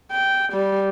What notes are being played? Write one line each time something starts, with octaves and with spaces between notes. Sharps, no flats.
G5
G3